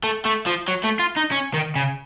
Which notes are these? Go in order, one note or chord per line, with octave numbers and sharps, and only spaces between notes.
A3
A3
F3
F#3
A3
F4
D#4
C#4
D#3
C#3